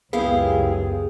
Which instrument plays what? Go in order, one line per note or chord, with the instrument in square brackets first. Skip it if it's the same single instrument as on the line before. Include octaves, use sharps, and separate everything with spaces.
[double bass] C#2 F#2 [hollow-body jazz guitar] B3 [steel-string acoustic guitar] E4 G4 F5 [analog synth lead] G#4